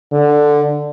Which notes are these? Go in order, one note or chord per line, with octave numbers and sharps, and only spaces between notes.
D3